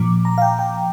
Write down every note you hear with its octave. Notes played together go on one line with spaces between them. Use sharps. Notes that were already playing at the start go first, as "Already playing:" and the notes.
Already playing: A#2 F3 D6
A#5
F5
G5
G5